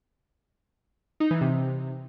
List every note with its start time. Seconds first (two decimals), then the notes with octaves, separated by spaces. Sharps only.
1.20 D#4
1.31 E3
1.41 C3